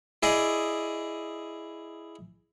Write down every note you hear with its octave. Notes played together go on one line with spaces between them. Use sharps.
E4 G#4 D5 D#5